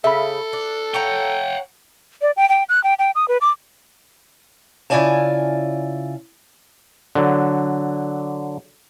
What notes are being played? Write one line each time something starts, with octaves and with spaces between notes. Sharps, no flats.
C#3 A4 E5 B5
D4
C#5 F#5 G5 A#5
D5
G5
G5
F#6
G5
G5
D#6
B4
D6
C#3 E4 F4 D5 G#5 A5
D3 F#3